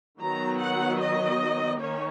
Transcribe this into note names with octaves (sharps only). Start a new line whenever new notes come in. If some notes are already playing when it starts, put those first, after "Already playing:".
D#3 F#3 B3 A#5
F#5
D#5
D#3 A#3 C#4 C#5